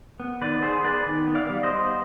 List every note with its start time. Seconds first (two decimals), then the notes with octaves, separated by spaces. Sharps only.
0.20 B3
0.41 D#3 B4 D5
0.62 B3 G#4 C5
0.84 B3 B4 D5
1.06 D#3
1.28 B3
1.35 D5 F5
1.50 G3
1.63 C5 D#5
1.72 B3